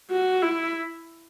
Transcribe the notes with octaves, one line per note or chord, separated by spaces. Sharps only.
F#4
E4